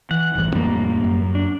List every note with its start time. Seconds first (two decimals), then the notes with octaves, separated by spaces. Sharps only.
0.11 E3 F#5
0.36 A1 G2 E3
0.55 F2 A2 D3 G3 A#3
1.04 F#2
1.35 D4